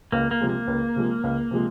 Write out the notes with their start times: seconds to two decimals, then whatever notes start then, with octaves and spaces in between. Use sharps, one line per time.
0.12 C#2 A#3
0.31 A#3
0.41 C3 F3 G#3
0.49 A#3
0.68 C#2
0.96 C3 F3 G#3
1.24 C#2
1.51 C3 F3 G#3